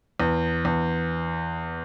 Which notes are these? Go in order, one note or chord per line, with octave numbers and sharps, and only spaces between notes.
E2
E2